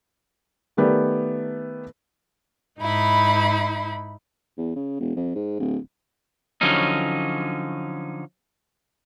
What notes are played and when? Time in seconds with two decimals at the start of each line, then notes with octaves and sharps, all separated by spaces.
0.77 D#3 A3 B3 G4 A#4 D5
2.79 G#2 D#4 E4 B5
4.58 E2
4.76 C#3
5.00 E1
5.16 F2
5.35 G#2
5.59 D1
6.61 D3 F3 F#3 C#4 D#4